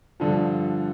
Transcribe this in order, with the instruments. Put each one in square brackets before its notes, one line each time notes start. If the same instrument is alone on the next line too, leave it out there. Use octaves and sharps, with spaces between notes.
[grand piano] G2 D3 F3